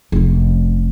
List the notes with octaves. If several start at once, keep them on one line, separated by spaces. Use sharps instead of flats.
F1 C#4